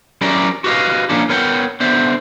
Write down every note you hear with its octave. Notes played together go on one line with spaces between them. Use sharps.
F#3 C#4 E4 G4 A#4 D5
F#4 G4 B4 D5 D#5 F5
F3 A#3 C#4 D4
B3 A#4 C#5 F#5 G5
D3 B3 C5 E5